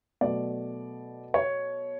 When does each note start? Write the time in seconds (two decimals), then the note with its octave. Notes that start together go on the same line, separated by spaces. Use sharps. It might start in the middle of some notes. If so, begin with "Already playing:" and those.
0.21 B2 F#3 A3 D5
1.34 C#5